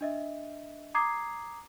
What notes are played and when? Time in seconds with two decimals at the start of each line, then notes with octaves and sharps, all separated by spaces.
0.01 D4 D#5 E5
0.95 A#5 D6 D#6 G#6 C7